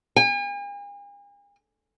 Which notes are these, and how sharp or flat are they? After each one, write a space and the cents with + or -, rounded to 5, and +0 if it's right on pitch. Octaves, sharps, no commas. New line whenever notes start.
G#5 -45